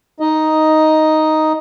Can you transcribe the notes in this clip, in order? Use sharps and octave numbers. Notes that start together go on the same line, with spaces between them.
D#4 D#5